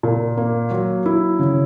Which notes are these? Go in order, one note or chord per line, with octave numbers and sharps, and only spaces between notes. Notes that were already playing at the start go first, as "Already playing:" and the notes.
A#2
A#3
F#3
E4
C#3